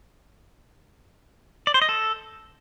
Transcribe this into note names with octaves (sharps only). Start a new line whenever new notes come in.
D5
C5
D#5
A4